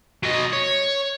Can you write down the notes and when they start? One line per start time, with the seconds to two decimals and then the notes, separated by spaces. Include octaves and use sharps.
0.23 F#3 D#5
0.53 C#5